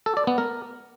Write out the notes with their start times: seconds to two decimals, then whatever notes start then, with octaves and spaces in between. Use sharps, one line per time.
0.06 A4
0.17 D5
0.27 B3
0.38 A#4